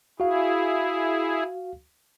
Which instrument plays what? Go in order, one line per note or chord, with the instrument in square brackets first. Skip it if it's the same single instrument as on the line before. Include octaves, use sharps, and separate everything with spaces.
[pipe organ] E4 G#4 [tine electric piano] F#4 F5